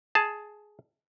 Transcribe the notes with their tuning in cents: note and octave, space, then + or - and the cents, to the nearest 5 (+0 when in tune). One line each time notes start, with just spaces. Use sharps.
G#4 +10 A5 +0